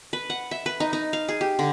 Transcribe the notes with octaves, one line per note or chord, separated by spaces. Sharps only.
B4
F#5
E5
B4
D#4
D#4
F5
G#4
G4
D3